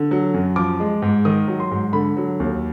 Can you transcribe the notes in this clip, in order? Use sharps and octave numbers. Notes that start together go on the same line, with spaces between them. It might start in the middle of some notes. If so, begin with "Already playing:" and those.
Already playing: D3
F#3
F#2
F3 D6
G#3
G#2
D#3 D#6
F#3
C6
G#2
D3 B5
F#3
D#2